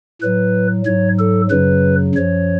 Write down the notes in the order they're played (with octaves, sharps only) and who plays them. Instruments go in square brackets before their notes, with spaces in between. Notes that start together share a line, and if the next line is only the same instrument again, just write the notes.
[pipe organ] A2 F#3 B4
G#2 F#3 C#5
A4
F#2 C#3 F#3 B4
F#2 F3 C#5